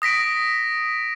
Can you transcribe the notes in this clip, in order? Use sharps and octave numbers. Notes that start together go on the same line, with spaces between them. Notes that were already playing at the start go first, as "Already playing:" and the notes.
D#6 A#6 B6 D7